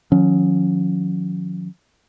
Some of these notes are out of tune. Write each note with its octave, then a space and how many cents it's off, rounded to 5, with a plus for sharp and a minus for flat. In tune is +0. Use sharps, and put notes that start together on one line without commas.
D#3 +0 F#3 -45 C#4 +0